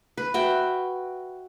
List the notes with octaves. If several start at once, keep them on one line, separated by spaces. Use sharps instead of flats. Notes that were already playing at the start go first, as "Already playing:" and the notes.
B4
F#4 E5 G5